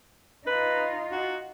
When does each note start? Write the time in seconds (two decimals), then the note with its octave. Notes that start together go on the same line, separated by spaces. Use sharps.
0.47 D#4 F4 B4
1.11 F#4